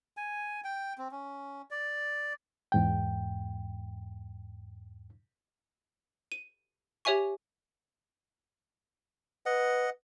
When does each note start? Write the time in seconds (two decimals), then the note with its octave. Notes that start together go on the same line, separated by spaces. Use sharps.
0.17 G#5
0.64 G5
0.98 C4
1.11 C#4
1.71 D5
2.72 E2 G#2 G5
6.32 D#7
7.05 G4 C#5 E5 G#5 C#6
9.46 B4 D#5 F#5